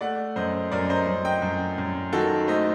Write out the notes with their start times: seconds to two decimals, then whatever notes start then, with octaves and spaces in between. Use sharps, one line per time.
0.01 A3 D5 F#5
0.36 F#2 C5 D#5
0.72 F#2 A#4 D5
0.90 C5 D#5
1.07 F#2
1.25 D#5 G5
1.42 F#2
1.78 F#2
2.13 D#3 F#4 A4
2.48 A3 C5 D#5